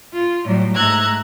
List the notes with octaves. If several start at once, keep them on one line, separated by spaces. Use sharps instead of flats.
F4
A2 F#3 G3
G#2 A3 A#5 E6 F#6 G#6